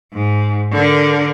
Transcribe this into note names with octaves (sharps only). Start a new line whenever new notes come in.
G#2
D3 A#4